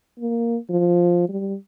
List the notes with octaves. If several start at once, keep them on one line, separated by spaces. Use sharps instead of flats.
A#3
F3
G3